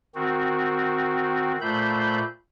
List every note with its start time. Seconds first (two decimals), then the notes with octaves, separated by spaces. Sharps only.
0.15 D#3 C4 F#4
1.61 A#2 A3 C5 B5 G6